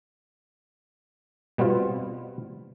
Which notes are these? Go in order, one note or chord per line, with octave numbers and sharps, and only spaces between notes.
B2 G3 B3 C4 F4